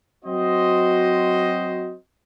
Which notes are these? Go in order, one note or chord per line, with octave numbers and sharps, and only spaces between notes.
F#3 C4 F#4 C5 D#5